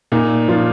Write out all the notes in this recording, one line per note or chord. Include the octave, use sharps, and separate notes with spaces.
A#2 D#4
F3 F4